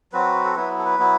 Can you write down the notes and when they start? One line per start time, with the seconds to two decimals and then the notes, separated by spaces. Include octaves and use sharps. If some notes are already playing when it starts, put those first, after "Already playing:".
0.13 F#3 C4 F#4 B4
0.45 A4
0.56 F#3 B3 E4 B4
0.79 A4
0.85 B4
0.99 F#3 B3 E4